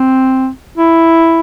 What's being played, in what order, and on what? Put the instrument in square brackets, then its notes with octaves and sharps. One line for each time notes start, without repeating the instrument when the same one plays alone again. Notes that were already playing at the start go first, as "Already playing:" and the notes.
Already playing: [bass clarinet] C4
E4